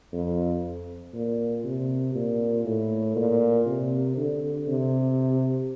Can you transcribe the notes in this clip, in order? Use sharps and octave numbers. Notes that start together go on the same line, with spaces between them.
F2
A#2
C3
A#2
A2
A#2
C3
D3
C3